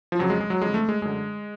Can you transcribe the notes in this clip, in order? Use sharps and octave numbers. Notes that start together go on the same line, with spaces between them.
F3
F2 C#3 F#3
G#3
G#3
F#3
F2 D3 G#3
A3
G#3
F#2 D3 G#3